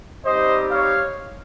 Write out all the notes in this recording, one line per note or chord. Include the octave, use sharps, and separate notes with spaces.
G3 C4 D#4 G4 C5 D#5
C#5 F5